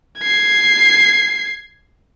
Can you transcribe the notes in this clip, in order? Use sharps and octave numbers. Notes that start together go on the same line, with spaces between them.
G#6 C7